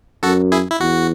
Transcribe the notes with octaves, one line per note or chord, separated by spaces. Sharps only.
F#2 F#4 A4
E4 G#4
E4
E2 F#4